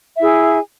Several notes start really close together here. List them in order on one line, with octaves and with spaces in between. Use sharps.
E5 E4 G#4 G#5